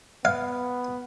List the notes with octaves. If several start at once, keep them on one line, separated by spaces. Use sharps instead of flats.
B3 F5